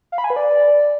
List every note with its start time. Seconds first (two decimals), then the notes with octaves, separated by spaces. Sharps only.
0.12 F5
0.18 B5
0.24 G#5
0.30 B4
0.36 D5